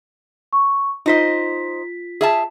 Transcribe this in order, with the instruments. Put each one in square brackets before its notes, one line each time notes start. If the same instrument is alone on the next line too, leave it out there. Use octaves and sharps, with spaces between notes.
[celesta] C#6
[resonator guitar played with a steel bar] D#4 C5 D#5 [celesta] F4 B6
[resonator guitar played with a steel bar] G#4 E5 A5